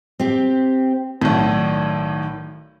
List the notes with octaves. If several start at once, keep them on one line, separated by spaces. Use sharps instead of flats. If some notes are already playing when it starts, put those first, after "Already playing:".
C4 G4
B1 A2 D#3 D5